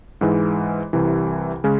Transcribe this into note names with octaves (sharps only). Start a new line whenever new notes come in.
G#2 E3 G#3
C2 C3 E3
C#3 G#3 C#4